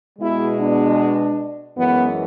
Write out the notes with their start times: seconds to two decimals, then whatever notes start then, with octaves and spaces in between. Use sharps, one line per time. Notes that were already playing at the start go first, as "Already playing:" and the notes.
0.19 B2 G#3 E4
0.59 D4
1.77 F#2 E3 G#3 B3